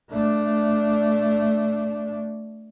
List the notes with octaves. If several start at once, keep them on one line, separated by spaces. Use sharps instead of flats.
A3 D4